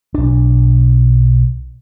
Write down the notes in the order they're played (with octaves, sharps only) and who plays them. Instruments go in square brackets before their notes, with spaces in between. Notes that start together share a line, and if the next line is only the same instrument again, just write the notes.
[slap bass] B1 D4